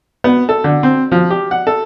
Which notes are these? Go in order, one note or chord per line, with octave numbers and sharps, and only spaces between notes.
B3
A4
D3
C4
F3
G4
F#5
A4